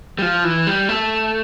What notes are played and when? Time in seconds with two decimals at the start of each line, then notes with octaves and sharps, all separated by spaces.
0.19 G3
0.22 F3
0.44 E3
0.67 G3
0.89 A3